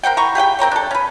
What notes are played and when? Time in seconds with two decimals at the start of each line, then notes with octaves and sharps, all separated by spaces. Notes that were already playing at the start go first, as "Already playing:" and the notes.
0.03 A#4 C5 F#5 G5
0.17 E3 A#5 C#6
0.35 G4 G#4 F#5 G5
0.59 C4 A#4 C5 C#5
0.71 D4 A4
0.91 C#4 B4